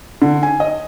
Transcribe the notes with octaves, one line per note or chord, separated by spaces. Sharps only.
D3
G#5
D#5